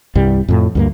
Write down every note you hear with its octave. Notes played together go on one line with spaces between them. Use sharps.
C2 G2 G3
F2 A2
D2 G2 A#3